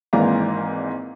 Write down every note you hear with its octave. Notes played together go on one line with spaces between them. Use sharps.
G#1 G#2 E3 A#3 D5 A#5